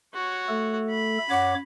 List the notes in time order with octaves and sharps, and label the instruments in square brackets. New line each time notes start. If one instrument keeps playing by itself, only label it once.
[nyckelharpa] F#4 C#5
[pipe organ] A3 A4
[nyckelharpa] B5
[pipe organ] F#2 C#5 D6 [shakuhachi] F#5